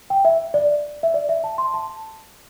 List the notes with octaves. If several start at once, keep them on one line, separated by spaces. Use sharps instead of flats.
G5
E5
D5
E5
D5
E5
A5
C6
A5